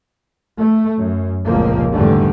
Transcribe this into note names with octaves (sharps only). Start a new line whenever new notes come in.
A3
F#2
F1 C#2 A#2 F3 A#3
E2 G#2 D3 G3 A3